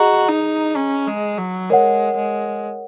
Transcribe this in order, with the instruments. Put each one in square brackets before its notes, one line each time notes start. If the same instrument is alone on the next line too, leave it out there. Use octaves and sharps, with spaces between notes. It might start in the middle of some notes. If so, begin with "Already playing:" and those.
Already playing: [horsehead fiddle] F#4 [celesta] G#4 D#5 A#5
[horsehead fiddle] D#4
C#4
G#3
F#3
[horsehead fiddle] G#3 [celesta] A#4 C#5 F#5
[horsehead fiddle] G#3